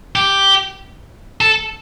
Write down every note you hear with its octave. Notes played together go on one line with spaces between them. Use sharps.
G4
A4